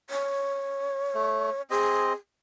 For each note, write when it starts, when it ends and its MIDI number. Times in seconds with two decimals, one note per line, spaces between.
0.10 1.62 73
1.15 1.50 57
1.70 2.13 60
1.70 2.13 68
1.70 2.13 75